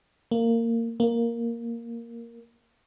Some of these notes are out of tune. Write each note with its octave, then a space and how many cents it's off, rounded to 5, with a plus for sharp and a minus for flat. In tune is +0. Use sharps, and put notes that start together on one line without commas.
A#3 -20
A#3 +0